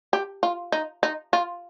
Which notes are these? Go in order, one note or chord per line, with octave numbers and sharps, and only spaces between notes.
G4
F4
D#4
D#4
F4